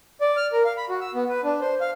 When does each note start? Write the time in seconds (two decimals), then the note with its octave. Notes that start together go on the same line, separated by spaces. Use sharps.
0.21 D5
0.37 F6
0.53 A#4
0.65 F5
0.77 B5
0.90 F#4
1.01 E6
1.14 B3
1.29 B4
1.44 D4
1.61 C5
1.81 F5